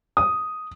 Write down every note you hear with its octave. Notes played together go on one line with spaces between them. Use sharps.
D#6